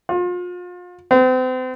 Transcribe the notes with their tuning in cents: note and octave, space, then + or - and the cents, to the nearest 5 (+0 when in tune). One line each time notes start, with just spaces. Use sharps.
F4 +35
C4 -40